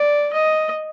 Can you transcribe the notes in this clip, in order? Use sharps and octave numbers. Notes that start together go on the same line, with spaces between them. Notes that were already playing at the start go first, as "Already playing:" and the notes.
Already playing: D5
D#5